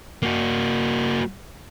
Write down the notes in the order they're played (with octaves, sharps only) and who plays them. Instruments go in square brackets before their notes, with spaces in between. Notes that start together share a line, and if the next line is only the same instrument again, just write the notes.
[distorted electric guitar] A#3 F#4